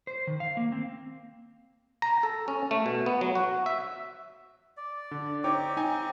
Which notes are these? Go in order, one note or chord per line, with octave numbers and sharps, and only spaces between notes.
C5
D#3
F5
A#3
C4
A#5
A4
C#4
A3
B2
B3
F#3
F#4
E5
D5
D3
C4 D#4 G4 C#5 D6
D#4 G#5